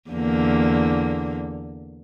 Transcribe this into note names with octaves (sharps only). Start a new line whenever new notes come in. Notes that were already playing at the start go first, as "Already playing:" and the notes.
E2 D3 A#3